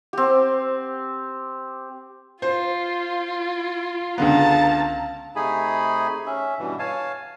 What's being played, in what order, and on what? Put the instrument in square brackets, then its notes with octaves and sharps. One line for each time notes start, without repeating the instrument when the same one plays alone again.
[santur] C4 G4
[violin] F4 [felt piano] C5
[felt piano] C#2 D3 B3 [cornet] F5 [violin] A5 A#5
[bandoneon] C3 A3 D#4 G#4 G#5 B5
C#4 E5
G2 B2 E3
C#5 F5 G#5 A5